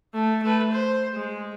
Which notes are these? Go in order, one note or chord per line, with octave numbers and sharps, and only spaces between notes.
A3
A3 B4
C5
G#3